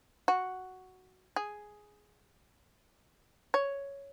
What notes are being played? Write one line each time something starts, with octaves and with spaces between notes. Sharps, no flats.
F#4
G#4
C#5